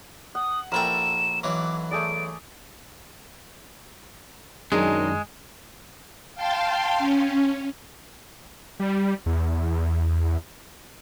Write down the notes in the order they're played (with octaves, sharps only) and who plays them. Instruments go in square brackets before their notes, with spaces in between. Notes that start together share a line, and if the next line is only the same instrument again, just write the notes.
[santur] F#5 [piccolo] D#6
[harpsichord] A#1 E4 G5 [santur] A4 A#4 [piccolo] E7
[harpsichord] B1 E3 F#3 [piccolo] D6
[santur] A3 G#4 D5 [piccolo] D7
[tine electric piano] F#2 D#3 D4 [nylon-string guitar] F#3 D#4 G#4 [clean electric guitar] G#3
[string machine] F5 G5 A5 C6
C#4
[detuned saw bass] G3
E2